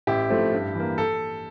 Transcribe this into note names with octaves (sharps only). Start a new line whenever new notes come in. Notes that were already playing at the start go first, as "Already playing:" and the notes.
A1 E4 G4
A2 F3 A3 C4
G2
E3 A#3
A4